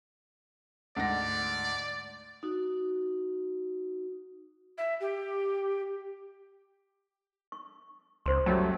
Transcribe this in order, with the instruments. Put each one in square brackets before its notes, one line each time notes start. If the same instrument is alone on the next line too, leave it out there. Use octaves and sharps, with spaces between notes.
[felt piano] D2 G#2 A#6 [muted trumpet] D5
[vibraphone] D#4 F#4
[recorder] E5
G4
[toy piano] C#6
[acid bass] C#2 [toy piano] C5 C6
[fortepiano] F#2 F#3 G3 [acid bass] A3